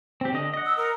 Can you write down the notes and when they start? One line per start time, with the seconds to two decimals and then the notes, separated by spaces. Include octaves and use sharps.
0.21 C4 G4
0.33 D3 D#5
0.54 D#5 F#5
0.65 E6
0.77 A#4